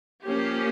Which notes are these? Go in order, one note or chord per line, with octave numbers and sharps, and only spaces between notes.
F3 A#3 C#4 G4